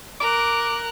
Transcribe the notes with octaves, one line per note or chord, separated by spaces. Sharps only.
A#4 D6 F#6